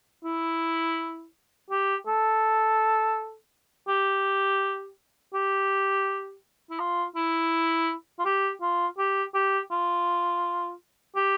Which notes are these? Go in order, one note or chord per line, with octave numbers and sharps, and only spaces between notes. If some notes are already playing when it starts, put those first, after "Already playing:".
E4
G4
A4
G4
G4
E4
F4
E4
F4
G4
F4
G4
G4
F4
G4